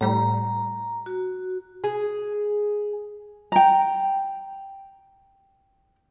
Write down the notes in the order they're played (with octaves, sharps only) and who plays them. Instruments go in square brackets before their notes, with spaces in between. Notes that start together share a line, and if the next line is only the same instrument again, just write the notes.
[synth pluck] A2 G3 [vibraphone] A#5
[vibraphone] F#4
[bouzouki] G#4
[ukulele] G5 A#5